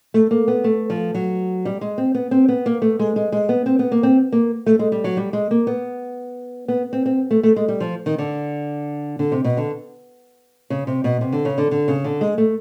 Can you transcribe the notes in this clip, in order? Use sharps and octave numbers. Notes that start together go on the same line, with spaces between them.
A3
A#3
B3
A3
F3
F#3
G3
G#3
C4
B3
C4
B3
A#3
A3
G#3
G#3
G#3
B3
C4
B3
A#3
C4
A#3
A3
G#3
G3
F#3
G3
G#3
A#3
B3
B3
C4
C4
A3
A3
G#3
G3
F3
D#3
D3
D3
C3
B2
D3
C#3
C3
B2
C3
D3
C#3
D3
D3
C#3
D3
G#3
A3